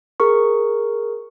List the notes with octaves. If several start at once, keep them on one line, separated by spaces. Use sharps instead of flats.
G#4 A#4 C#6